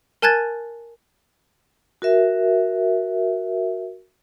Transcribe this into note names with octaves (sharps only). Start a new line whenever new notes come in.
A#4 G#5 A5 F#6 G#6 A6
F#4 A#4 E5